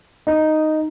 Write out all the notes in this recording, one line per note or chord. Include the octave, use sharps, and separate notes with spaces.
D#4